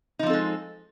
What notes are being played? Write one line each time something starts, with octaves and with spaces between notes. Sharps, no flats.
F3 G#3 C4 D#4 A4